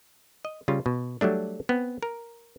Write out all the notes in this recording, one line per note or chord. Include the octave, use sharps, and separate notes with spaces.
D#5
C#3 G3 F4
B2
F#3 G3 A3 D4
B3 C4
A#4